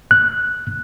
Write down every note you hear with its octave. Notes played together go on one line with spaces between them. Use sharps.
F#6